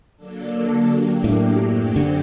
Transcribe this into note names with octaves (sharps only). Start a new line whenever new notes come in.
D3 F#3 A#3 D4 A4
F#3 A#3 D4 G4
A2
F#2 F#3 C4 G4
D3